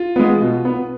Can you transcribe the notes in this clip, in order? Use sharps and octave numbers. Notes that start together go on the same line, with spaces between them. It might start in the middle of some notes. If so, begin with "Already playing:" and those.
Already playing: F4
G#3 B3
B2
B3